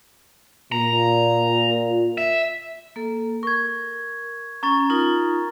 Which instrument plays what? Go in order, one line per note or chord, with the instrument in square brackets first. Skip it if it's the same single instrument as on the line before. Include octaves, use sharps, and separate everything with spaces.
[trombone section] A#2 [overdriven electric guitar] A#5
[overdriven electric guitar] E5
[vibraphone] A#3 A4
[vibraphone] A#4 [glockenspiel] C#6 G#6
[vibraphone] C#4 [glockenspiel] A#5 C#6 A6
[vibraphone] D#4 F4 A#4